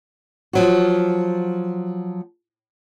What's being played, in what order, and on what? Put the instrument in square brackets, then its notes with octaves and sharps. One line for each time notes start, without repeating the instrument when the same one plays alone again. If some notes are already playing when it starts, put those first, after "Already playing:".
[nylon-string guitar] F3 F#3 F#4